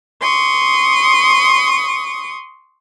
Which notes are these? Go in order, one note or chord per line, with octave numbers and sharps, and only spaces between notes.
C6 C#6 D#6